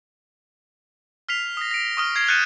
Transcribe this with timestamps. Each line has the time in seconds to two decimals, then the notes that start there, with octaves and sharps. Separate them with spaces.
1.29 F6 B6 C7 F7
1.57 D#6 A#6
1.71 A#6 D7
1.97 C#6 D#6 F6
2.16 G#6 C7 D7
2.28 F#6 G6 A6 C#7 D#7 E7